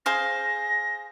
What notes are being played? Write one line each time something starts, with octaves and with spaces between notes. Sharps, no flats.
G#4 C5 F5 A#6